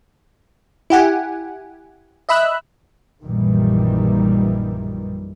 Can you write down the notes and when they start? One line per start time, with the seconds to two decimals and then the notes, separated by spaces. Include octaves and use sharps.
0.90 E4 G4 F#5 G#5
2.29 D#5 E5 B5 E6 F#6
3.24 A#1 F#2 A#2 D#3 E3 G3